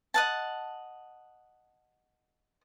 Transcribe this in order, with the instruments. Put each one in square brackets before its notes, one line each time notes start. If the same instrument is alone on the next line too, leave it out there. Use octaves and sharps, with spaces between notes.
[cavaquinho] D#5 F#5 A5